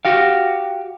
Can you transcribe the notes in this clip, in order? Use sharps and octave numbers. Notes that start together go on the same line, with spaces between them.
F#4 G4 F5